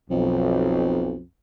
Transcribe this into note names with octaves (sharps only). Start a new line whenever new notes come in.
B1 F2